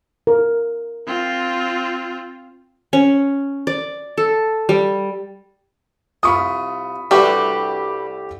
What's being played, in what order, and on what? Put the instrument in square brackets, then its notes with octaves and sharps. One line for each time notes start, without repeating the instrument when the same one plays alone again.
[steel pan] A#4
[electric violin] C4 F4
[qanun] C#4
D5
A4
G3
[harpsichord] C2 F4 [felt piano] B5 C#6 D#6
[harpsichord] C2 A3 D4 [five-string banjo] G3 F#4 B4 [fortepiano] G4